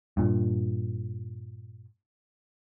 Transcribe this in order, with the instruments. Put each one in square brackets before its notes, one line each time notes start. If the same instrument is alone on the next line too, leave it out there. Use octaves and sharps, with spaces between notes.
[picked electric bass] G2 A#2